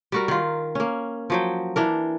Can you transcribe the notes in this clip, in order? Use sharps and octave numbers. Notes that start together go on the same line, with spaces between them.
G3 F#4 A#4
D#3 F4
A#3 C#4
F3 F#3 G5
E3 D4 A#4